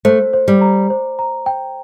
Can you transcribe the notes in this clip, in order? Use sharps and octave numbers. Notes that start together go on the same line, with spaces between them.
A3 C5
C5
G3
A#5
C5
A#5
G5